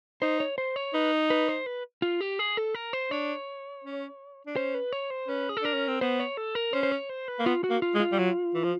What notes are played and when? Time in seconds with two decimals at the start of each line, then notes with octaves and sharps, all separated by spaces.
0.22 D#4 C5
0.40 C#5
0.58 C5
0.76 C#5
0.94 D#4 B4
1.30 B4
1.49 C5
1.66 B4
2.02 F4
2.21 G4
2.39 G#4
2.57 A4
2.75 A#4
2.93 C5
3.11 D4 C#5
3.84 C#4
4.47 D4
4.56 C#4 C5
4.74 B4
4.92 C#5
5.10 C5
5.28 C#4 B4
5.49 G#4
5.57 A4
5.62 D4 A#4
5.74 C#4
5.88 C4
6.01 B3 C5
6.20 C#5
6.37 A4
6.55 A#4
6.73 C#4 C5
6.83 C5
6.92 C#5
7.09 C5
7.28 B4
7.39 A#3
7.46 B3 F4
7.64 F#4
7.70 A#3
7.82 F4
7.95 G#3
8.00 F4
8.12 G3
8.19 F#3
8.55 E3
8.64 F3